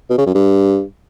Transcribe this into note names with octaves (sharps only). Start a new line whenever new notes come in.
B2
C#3
F#2
G2